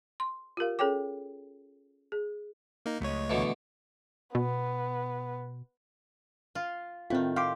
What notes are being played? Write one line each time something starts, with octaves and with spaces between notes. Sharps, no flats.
C6
F4 G4 A#4 F5
C#4 G#4 A4 C#5 G5 D6
G#4
A#3 D#4
C#2 A3 C#5 D#5
B2 D3 E3
B2 B3
F4
A2 D#3 C4 F4
G4 F5 C6 D6